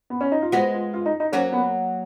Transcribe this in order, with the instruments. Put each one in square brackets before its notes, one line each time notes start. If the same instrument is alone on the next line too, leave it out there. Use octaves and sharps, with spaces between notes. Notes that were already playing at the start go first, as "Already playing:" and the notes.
[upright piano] B3
C#4
D#4
F4
[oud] G#3 B3 [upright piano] F#4
[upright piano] F4
F4
D#4
D#4
[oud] F#3 A#3 [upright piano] C#4
[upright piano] B3